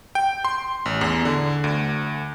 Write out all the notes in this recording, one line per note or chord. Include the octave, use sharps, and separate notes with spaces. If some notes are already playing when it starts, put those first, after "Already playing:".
G5
C6
A1
E2
D3
D2